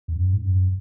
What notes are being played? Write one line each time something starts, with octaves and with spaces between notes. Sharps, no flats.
E2
F#2
G#2
F#2